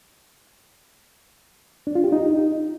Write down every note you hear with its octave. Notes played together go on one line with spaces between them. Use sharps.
D4
F4
G4
D#4